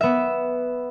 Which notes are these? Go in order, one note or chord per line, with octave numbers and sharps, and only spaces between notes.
B3 E5